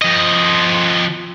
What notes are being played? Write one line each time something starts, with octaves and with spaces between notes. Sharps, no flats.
F3 D#5